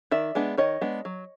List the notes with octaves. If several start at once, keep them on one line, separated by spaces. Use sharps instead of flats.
D#3 D5 E5
G#3 B3 D4
D#3 C#5 D#5
G#3 B3 D4
F#3